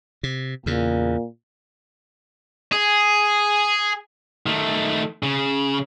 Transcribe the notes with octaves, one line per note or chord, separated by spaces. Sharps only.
C3
E2 A#2 C#3
G#4
D#3 A3
C#3